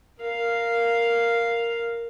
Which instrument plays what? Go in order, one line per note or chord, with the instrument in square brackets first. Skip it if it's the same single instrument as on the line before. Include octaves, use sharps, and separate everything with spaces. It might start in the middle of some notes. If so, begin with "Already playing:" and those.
[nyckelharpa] A#4 F5